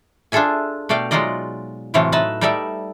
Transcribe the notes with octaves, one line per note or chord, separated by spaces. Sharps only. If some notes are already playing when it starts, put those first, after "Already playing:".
D4 F4 G#4 A4 E5 G#5
B2 A3 D5 F5 G5
F#3 G#3 D#4 F4 D5 D#5
A2 C3 E3 F#3 A3 F4
D#4 B4 E5 A5
G3 D#4 A4 D5 E5